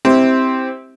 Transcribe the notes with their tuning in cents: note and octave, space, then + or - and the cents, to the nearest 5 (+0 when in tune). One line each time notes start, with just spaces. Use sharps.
C4 +0 E4 -25 G4 +0